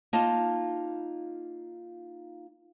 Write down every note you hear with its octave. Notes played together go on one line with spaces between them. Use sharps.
A#3 D#4 F4 D#5 A5